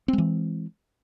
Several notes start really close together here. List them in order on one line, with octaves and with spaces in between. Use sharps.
C4 G#3 E3